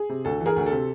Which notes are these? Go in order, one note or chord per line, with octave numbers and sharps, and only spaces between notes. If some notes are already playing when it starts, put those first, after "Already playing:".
Already playing: G#4
C3
D2 A4
E3
G#4 A#4
D2
A4
C3